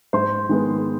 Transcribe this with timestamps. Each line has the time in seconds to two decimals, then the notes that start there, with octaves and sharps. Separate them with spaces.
0.13 G#2 C5 C6
0.49 D#3 G#3 B3